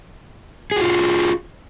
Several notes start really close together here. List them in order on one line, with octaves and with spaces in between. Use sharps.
G#4 F#4 F4